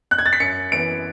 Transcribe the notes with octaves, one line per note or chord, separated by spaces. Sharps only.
F#6
G#6
A6
B6
F#2 C#7
E3 B3 D7